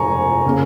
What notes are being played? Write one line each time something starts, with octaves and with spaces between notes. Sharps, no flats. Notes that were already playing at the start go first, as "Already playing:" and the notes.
Already playing: F1 F2 G#3 G#5 A#5 C#6
C#3 A#3